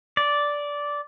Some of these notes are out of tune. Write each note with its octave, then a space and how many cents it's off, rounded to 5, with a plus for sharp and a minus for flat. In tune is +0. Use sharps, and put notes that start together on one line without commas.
D5 -10